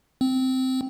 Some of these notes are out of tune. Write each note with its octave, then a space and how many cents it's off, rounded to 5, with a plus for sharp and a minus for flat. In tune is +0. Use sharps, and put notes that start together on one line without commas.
C4 -10